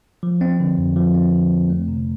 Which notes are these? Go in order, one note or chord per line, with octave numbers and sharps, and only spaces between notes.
F3
C4
D3
F2
F3
C4
D3
F2
A3
C3